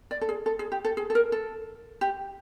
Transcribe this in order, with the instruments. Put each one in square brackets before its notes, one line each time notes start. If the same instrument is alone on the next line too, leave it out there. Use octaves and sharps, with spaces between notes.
[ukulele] D5
A4
G#4
A4
G#4
G4
A4
G#4
A4
A#4
A4
G4